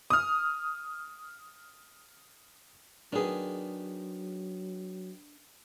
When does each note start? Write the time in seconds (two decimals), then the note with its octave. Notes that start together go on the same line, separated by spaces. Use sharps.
0.10 D#6 F6
3.13 D#3 F#3 B3 D4 G#4